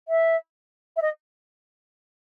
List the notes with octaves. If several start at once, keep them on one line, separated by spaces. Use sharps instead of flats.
E5
E5
D#5